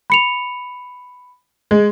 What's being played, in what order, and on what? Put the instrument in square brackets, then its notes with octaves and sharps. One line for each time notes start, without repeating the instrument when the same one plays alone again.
[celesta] B5 C#7 F7
[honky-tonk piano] G#3